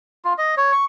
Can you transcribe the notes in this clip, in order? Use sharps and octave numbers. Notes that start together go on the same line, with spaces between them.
F4
D#5
C#5
C#6